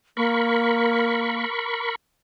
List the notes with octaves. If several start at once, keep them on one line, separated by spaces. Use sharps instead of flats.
A#3 A#4 B5 C#6